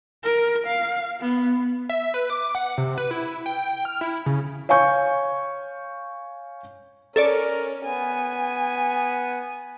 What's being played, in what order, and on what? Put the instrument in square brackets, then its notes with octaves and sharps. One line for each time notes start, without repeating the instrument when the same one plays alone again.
[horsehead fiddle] A#4
F5
B3
[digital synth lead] E5
B4
D6
F#5
C3
B4
E4
G5
F6
E4
C#3
[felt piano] C#5 F5 G#5 C#6 G6
[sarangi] C#4 [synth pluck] A4 C#5 D5 [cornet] A#4
[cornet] B3 [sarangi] G#5